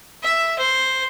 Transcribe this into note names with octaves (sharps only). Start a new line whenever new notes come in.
E5
C5